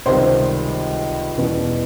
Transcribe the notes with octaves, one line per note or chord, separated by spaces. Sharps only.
C#2 C3 D#3 G3 C5
E2 B2 G3